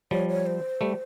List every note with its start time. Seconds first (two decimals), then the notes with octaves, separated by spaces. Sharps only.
0.11 F3 G3 C#5
0.29 C#5
0.46 C5
0.81 G3 A3